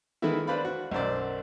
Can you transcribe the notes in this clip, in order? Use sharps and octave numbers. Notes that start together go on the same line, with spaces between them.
D#3 E3 G#3 A3 B3 E4
D4 B4 C5 D5 F5 B5
F#4
B1 F#2 C5 D5